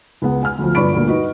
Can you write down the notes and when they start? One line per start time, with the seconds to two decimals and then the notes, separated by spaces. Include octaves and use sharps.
0.22 C#2 G#3 B3 F#5
0.43 G#5 F6
0.59 D2 F3
0.75 G1 F4 D5 B5 C#6 D7
0.93 D2 G2 A#2
1.08 D#4 F#4 B4 D#5